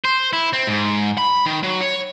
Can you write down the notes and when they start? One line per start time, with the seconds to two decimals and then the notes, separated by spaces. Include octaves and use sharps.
0.05 C5
0.33 E4
0.53 C4
0.67 G#2
1.18 B5
1.46 D#3
1.63 F#3
1.81 C#5